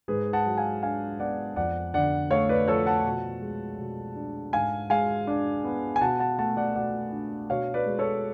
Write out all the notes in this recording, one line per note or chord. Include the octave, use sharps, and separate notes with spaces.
G#2 G#4 B4
F#5 A5
F#3
F5 G#5
D4 F5 G#5
B3 D5 F#5
F2 D5 F#5
D3 D5 F#5
A3 C#5 F5
B4 D5
F3 A4 C#5
F#5 A5
B2
G#3
B2
D4
G#2 F5 G#5
G#3 F5 G#5
D4
B3
G#5
B2 F#5 A5
F#5 A5
A3 F#5 A5
D5 F#5
B2 D5 F#5
D4
B2 C#5 F5
B4 D5
G#3
A4 C#5